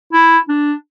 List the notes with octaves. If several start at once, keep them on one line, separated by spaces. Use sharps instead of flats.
E4
D4